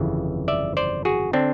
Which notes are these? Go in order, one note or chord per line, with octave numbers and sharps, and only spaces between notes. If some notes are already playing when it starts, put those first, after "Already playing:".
Already playing: G1 F2 C#3 E3
D5 E5
C5 D5
F#4 G#4
D3 C4 D4